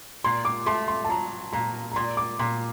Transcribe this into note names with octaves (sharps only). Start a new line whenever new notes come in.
A#2 C6
D6
A3 C6
C6
A5
F#3 A#5
A#2 A#5
A#5
A#2 C6
D6
A#2 C6